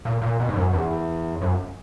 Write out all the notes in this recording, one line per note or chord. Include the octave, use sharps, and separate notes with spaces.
A#2
A#2
B2
G#2
F#2
E2
F#2